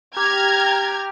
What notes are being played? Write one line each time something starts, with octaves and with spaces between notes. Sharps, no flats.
G4 A#5 F6 G#6